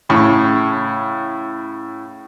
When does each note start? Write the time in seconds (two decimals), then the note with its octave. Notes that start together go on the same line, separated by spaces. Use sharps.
0.09 A2 C#3